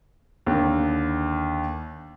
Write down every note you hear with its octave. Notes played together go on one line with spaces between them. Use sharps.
D#2 D3 D#3